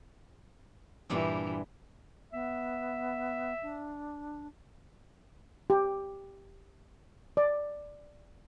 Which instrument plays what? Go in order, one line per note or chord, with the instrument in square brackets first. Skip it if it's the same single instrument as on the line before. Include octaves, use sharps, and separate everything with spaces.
[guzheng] G2 A#2 G3 [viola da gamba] E3
[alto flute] B3 [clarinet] E5
[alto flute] D4
[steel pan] G4
D5